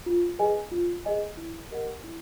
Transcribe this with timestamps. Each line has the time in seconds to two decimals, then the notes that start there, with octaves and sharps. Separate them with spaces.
0.06 F4
0.39 G#4 B4 D#5 G#5
0.72 F4
1.05 G#4 B4 D#5 G#5
1.37 E4
1.71 G4 A#4 D#5 F#5
2.04 E4